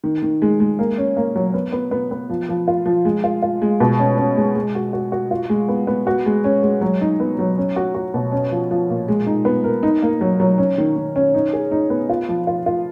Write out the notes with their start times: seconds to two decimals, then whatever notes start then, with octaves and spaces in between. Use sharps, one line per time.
0.04 D#3
0.22 D#3
0.42 G#3
0.60 G#3
0.79 A#3
0.98 C#4
1.17 A#3
1.36 F#3
1.54 B3
1.72 B3
1.91 B3
2.11 B3
2.29 F3
2.49 F3
2.68 F4
2.86 F3
3.05 G#3
3.24 F4
3.42 F4
3.62 G#3
3.80 B2
3.99 C#4
4.18 C#4
4.37 G#3
4.55 G#3
4.75 F#4
4.93 F#4
5.12 F#4
5.31 F4
5.49 G#3
5.68 B3
5.87 B3
6.07 F#4
6.26 G#3
6.44 C#4
6.63 G#3
6.81 F#3
7.01 D#4
7.20 B3
7.39 F#3
7.58 C#4
7.76 F#4
7.95 F#4
8.14 B2
8.32 C#4
8.51 F3
8.71 F3
8.89 A#2
9.08 G#3
9.26 D#4
9.45 B3
9.64 A#4
9.83 D#4
10.02 A#3
10.21 F#3
10.40 F#3
10.58 C#4
10.78 D#3
10.96 D#3
11.16 C#4
11.34 D#4
11.53 G#4
11.71 D#4
11.90 B3
12.09 F4
12.28 F3
12.47 F4
12.66 F4